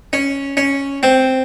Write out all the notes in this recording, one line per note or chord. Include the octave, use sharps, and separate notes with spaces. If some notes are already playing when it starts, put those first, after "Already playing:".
C#4
C#4
C4